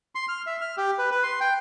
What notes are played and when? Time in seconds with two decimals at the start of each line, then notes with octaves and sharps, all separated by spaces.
0.15 C6
0.29 F6
0.47 E5
0.61 F6
0.77 G4
0.98 B4
1.11 B4
1.23 C6
1.41 G5